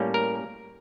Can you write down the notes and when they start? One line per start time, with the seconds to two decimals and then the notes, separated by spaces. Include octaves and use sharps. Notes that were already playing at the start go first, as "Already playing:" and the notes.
Already playing: A2 G3 A#3 C#4
0.14 A#4